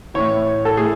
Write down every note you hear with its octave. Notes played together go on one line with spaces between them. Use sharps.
A2 E3 C#5
A4
A2 G#4